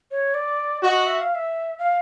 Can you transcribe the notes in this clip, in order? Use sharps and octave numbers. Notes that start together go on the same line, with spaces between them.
C#5
D5
F#4 D#5
E5
F5
E5
F5